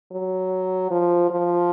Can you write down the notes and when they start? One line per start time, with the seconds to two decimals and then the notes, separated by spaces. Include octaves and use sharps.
0.12 F#3
0.91 F3
1.30 F3